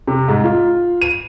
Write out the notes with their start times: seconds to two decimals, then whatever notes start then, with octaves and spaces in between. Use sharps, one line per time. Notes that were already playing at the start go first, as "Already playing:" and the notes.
0.07 C3
0.28 G#2
0.44 F4
1.01 D#7